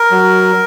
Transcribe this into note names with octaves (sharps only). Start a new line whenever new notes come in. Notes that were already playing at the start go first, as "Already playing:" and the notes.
Already playing: A#4
F#3